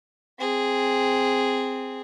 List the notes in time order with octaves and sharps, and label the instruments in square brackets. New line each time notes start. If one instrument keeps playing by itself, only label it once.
[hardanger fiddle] C4 G#4